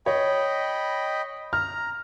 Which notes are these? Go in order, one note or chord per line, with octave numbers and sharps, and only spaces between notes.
C#5 D#5 G5 B5
A#5 F6